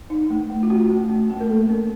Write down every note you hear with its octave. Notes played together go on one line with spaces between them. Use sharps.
D#4
A3
A3
F4
C#4 F#4
A3
C#4
A3
A#4
A#3 A4
C#4